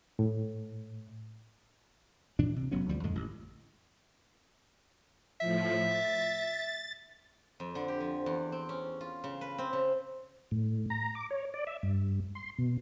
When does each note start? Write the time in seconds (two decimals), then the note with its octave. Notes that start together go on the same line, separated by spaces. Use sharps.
0.19 A2
2.39 A#2 E3 D4
2.56 C3
2.72 F1 F#3 B3 C#4
2.89 D2 F3 G3
3.03 F2 A2 D3 G#3
3.15 A1
5.41 A2 F3 E5
5.87 A6
7.60 F2
7.75 D3
7.88 G4
8.00 F3
8.26 E2
8.52 C4
8.69 C#4
9.01 F4
9.24 C#3
9.41 B4
9.58 C4
9.73 C#3
10.51 A2
10.90 A#5
11.15 D6
11.30 C#5
11.54 D5
11.67 E5
11.83 G2
12.35 C6
12.58 B2